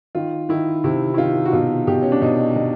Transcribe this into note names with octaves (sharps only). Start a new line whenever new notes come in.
D#3 F4
D#3 E4
C3 E4
E4
D#3 F4
F#4
B2 F4
B2 G4
C#4
D4
B2 D#4
B2